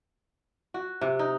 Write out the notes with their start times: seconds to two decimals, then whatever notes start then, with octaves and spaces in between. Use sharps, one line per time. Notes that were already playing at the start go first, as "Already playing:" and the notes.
0.74 F#4
1.01 C3
1.19 D#4